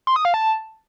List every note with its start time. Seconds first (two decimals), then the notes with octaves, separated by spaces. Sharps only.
0.07 C6
0.16 D#6
0.25 F5
0.34 A5